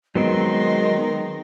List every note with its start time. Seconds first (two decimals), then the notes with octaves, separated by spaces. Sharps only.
0.15 D#3 F#3 G#3 B3 C4 D#5 C6